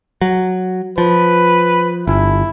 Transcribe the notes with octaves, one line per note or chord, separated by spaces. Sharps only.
F#3
F3 B4
G1 E4